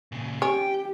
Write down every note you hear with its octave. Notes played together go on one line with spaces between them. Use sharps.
A#2 C#3
C#4 G4 G5